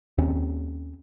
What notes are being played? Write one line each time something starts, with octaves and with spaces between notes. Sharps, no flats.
D#2 C4 C#4